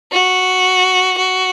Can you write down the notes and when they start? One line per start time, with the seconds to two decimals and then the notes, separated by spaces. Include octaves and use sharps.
0.12 F#4
1.17 F#4